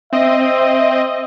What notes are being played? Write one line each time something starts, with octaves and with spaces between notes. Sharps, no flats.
C4 D#5 E5